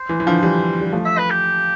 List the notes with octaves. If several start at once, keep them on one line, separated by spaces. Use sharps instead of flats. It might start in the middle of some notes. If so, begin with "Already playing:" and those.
Already playing: C5
E3
E3
D3 F3
E3 G3
G3
F3 A3
E5
B4
G4